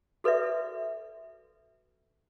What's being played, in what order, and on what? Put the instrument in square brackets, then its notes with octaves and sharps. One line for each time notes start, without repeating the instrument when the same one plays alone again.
[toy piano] F#4 A4 B4 D5 E5